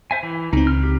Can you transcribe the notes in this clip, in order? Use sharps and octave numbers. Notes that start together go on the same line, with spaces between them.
C5 E5 G#5
E3
C#2 C4 D#4
F6
G4